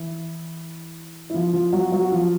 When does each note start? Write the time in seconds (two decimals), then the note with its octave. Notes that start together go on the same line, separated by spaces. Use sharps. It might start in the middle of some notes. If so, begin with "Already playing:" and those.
Already playing: E3 E4
1.30 E4
1.34 F3 F4
1.53 F3 F4
1.73 F#3 F#4
1.89 F4
1.92 F#3 F#4
2.12 F3 F4